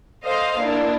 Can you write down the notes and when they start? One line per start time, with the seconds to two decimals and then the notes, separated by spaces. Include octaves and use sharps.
0.24 A4 C5 D#5 F5
0.60 A#3 D4 E4